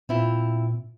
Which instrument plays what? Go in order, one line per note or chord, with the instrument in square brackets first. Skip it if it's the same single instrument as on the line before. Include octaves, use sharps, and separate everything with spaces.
[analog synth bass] A#2 [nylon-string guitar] C4 E4 F4